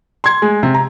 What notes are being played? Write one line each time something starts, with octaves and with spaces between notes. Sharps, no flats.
C6 G#6
G#3
C3
A#5